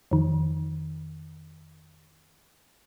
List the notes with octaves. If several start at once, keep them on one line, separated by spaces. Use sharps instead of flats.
F2 D#3